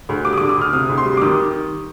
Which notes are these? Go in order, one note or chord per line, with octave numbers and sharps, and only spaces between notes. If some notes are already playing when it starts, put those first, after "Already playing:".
D2
G3 D6
D#6
D3 D6
D#6
D2 F6
C3 D#6
D2
C6
G3
D6
D#3 D#6